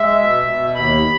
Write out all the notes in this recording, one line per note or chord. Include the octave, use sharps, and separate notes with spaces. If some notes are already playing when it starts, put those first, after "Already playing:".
Already playing: G#3 E5
B2
B2
D#2 B5